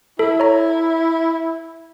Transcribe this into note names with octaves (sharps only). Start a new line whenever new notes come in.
E4 A4
C#5 A#5